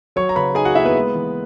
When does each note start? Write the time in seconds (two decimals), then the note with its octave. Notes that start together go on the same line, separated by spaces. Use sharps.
0.16 F#3 C#5 C#6
0.29 A#5
0.36 C#3 B4 B5
0.55 D#4 G#4 G#5
0.65 F#4 F#5
0.75 A#3 E4 E5
0.85 B3 B4
0.95 G#3
1.15 E3